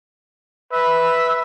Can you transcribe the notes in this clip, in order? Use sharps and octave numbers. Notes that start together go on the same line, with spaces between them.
B4 E5